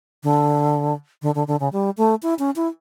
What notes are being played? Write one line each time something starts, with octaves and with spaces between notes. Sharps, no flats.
D3
D3
D3
D3
C#3
G3
A3
E4
C#4
E4